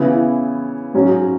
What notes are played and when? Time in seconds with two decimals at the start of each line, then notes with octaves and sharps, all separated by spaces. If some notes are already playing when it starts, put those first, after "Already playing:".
Already playing: C#3 E3 B3 E4
0.94 G#2 F#3 C#4